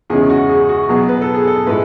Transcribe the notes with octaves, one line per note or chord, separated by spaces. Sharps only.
E2 C#3 G#3 C#4 G#4
F#4
G#4
F#4
B2 F#3 B3 G#4
B4
A4
G#4
A4
A2 G#3 B4